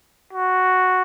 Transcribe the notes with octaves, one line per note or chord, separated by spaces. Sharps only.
F#4